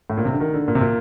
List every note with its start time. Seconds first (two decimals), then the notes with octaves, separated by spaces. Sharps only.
0.10 A2
0.17 A#2
0.25 C3
0.33 D3
0.40 D#3
0.54 D3
0.68 A#2
0.75 C3
0.81 A#2